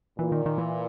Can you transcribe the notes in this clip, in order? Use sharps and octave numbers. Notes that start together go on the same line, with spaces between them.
A#2 E3
D#3
D#3
E3